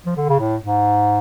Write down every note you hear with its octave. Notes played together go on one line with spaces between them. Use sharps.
F3
D3
C#3
A2
G#2